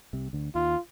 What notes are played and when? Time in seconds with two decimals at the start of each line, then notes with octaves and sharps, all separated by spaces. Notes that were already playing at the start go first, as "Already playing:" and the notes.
0.13 C2 C3
0.33 D2 D3
0.55 D#2 D#3 F4